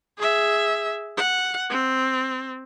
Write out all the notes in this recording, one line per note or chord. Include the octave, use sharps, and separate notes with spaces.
G#4 E5
F#5
C4